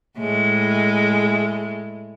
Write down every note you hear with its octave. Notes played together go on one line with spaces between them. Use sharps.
A2 G#3